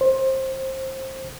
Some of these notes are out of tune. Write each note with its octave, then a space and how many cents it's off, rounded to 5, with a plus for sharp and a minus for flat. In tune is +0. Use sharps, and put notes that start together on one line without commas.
C5 +20